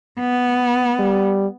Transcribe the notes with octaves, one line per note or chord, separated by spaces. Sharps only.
B3
G3